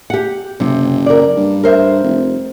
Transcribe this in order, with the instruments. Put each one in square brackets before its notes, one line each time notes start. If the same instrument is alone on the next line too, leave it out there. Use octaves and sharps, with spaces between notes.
[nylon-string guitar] G4 F#5
[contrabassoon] F#1 [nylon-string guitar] C3
[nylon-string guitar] A#4 D5
[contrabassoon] G2
[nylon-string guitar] A#4 C5 E5
[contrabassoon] F1